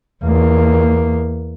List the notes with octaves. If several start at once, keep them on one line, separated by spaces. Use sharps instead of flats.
E2 A#3